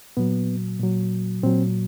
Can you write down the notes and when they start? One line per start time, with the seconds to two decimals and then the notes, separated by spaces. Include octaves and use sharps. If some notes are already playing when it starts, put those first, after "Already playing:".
0.17 A#2 F#3 B3
0.80 A#2 F#3
1.43 A#2 F#3 C4